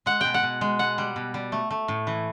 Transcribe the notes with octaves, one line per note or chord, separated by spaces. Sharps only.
G#3 F#5
B2 G5
F#5
B2
G#3
B2 F#5
G3
B2
G3
A3
A3
A2
E3